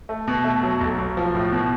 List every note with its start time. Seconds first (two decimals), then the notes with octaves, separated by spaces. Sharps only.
0.09 A3
0.28 B2
0.44 A3
0.63 F#3
0.81 B1
0.99 B1
1.17 F3
1.35 A2
1.52 B2